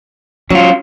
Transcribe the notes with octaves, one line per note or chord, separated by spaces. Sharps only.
F#3 C#4 F4